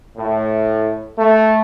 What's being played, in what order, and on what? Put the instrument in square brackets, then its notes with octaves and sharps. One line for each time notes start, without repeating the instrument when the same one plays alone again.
[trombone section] A2
A3